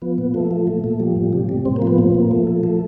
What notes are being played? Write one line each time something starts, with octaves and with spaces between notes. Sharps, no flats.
F3 B3
A#2
F3 A3
F3
A#2
A#2
F3 G3
A2
C3
C3
A2 C4
A#3
F3
B3
A#2 C4
A#2
A#3
F3 A3
F3
F3